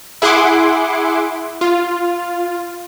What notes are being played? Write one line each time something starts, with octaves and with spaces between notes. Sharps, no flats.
E4 G#4 F#5 C6 D6
F4